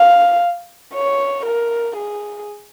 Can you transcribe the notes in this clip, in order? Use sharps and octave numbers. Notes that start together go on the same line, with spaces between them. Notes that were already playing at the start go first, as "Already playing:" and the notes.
Already playing: F5
C#5
A#4
G#4